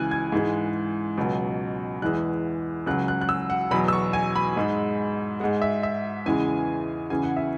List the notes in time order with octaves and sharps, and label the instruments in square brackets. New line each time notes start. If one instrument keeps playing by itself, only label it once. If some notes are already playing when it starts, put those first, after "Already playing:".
Already playing: [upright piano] C#2 C#3 E3 G#5 F#6
G#6
G#2 E3 G#3
C#2 B2 F#3
E2 E3 G#3 F#6
C#2 C#3 F#3 F#6
F#6
F#6
E6
F#5
E2 B2 F#3 B5
E6
C#6
G#5
B5
G#2 G#3
G#3 F#5
G#2
E5
E5
E2 C#3 E3 G#3 G#5
E2 C#3 E3 G#5
F#5
E5